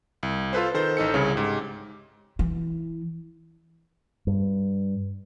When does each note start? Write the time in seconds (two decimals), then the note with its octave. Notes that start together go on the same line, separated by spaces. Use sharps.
0.23 C2
0.53 F4 A4 B4 C5
0.74 D#3 A4 C5 G6
0.97 A1 D#4 A4 C#7
1.14 C2 C#3 C#5
1.36 G#2 G4
2.39 E3
4.27 G2